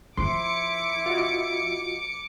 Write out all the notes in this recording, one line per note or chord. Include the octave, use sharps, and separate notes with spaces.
F3 E4 C6 D6 C#7
F4 F#4 D#5